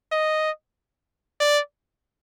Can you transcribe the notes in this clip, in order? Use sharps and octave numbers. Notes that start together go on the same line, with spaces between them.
D#5
D5